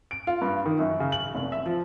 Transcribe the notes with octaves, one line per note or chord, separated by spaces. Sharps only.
D7
F4
G2
D#3
F#2
C#3
F#7
F1
E5
F3